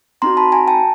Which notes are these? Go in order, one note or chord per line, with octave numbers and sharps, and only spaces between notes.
C4 D#4 F#4 A#5 C6
A5 B5
G#5 A#5
G5 A5